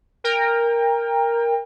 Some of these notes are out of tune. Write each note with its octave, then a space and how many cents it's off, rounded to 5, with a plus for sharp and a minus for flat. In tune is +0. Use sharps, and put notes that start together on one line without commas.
A#4 +0 G5 +30